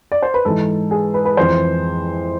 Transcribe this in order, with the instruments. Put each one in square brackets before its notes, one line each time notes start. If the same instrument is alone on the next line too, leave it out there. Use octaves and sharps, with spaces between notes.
[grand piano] D5
C5
B4
G#2 E3 A4
G#4
B4
B4
F2 E3 C5